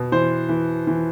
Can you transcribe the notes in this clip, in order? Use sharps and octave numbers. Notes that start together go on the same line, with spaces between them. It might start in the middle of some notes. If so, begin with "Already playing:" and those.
Already playing: B2
E3 C5
E3
E3